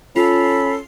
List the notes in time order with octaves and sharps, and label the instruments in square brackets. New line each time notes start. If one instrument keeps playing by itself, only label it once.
[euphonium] C#4 [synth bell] F4 C7 [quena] A4 [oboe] B5